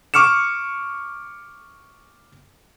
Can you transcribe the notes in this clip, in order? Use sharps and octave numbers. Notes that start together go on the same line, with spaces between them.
C#6 D6 F6 C#7 E7